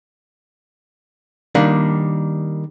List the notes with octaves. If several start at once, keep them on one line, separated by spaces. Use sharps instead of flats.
D#3 G3 A#3 D4 D#4